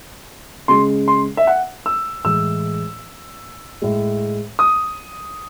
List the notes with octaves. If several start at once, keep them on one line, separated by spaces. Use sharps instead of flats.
C#3 G#3 C6
C6
E5
F#5
E6
A2 E3 G#3 E6
A2 G#3
D#6